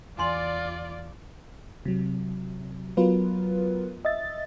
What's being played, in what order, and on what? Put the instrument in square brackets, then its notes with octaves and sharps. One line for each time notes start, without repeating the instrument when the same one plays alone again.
[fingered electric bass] E2 E3 [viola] F4 [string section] D5 [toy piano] G#5 C6
[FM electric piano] C3 F#3
F#3 B3 F4 A#4 B4
D#5 E5 A6